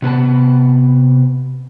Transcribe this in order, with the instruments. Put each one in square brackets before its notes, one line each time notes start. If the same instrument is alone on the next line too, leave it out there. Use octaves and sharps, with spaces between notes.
[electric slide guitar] C3 B3 C5 A5